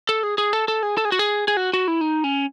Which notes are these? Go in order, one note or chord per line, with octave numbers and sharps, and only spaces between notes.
A4
G#4
G#4
A4
A4
G#4
A4
G#4
F#4
G#4
G#4
F#4
F#4
E4
D#4
C#4